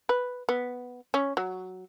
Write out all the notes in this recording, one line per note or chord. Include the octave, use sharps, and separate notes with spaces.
B4
B3
C#4
F#3